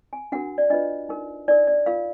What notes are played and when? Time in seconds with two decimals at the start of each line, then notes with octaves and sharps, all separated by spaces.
0.13 G#5
0.32 D4 F#4 A#4 F#5
0.58 D5
0.70 D4 F4 B4 D#5
1.09 D#4 A#4
1.48 D#4 A#4 D5
1.67 D5
1.86 F4 A#4 F5